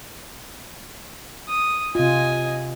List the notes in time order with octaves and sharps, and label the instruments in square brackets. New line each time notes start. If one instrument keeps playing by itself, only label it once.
[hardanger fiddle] D#6
[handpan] C3 F4 [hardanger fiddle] D#5 G#5